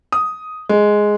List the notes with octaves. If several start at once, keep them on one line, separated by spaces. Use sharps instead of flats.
D#6
G#3